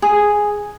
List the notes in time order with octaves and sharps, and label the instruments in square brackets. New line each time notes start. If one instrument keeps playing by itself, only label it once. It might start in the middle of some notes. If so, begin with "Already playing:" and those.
[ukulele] G#4